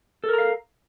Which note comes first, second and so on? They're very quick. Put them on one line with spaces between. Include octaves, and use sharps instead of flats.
A4 A#4 A#5 F5